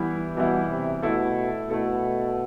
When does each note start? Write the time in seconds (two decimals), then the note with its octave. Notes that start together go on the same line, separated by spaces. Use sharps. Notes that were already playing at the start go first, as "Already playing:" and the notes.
Already playing: E3 G3 B3 E4
0.36 B2 E3 G3 B3 E4
0.70 C3
1.02 B2 A3 E4 A4
1.70 B2 A3 E4 A4